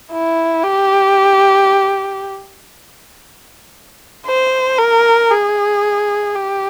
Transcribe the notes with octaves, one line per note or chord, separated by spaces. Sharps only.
E4
G4
C5
A#4
G#4
G4